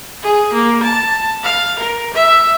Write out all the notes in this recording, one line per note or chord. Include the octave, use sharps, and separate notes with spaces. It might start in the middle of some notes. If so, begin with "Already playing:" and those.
G#4
A#3
A5
F5
A#4
E5